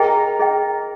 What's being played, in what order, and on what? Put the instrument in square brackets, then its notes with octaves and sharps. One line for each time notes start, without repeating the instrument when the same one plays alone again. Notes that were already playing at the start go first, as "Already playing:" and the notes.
Already playing: [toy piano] G#4 D#5 G5 [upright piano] A#4 A#5
[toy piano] G#4 D#5 G5